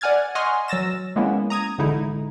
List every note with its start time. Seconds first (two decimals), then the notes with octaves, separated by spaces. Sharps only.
0.01 D5 F#5 G#5 F6 G#6 A6
0.35 D#5 F#5 G#5 C6 C#6 F6
0.68 F#3 E6 A6 A#6 E7
1.16 G#3 A#3 B3 C#4 E4
1.50 A#5 D#6 G#6
1.78 A1 D3 G#3 D#4 E4